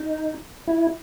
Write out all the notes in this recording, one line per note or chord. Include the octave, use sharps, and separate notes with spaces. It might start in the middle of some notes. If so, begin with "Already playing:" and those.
Already playing: D#4
E4